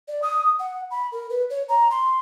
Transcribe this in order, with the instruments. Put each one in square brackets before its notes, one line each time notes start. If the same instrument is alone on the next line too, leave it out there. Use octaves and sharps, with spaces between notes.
[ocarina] D5
D#6
F#5
B5
A#4
B4
C#5
A#5
C6